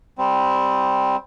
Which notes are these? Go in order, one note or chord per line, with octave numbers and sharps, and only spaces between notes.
G3 C4